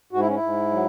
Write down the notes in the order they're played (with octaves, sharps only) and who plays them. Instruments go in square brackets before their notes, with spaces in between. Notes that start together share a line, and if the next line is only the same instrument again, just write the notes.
[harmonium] G#2 F#4
E4
C#4
E4
G#2
F#3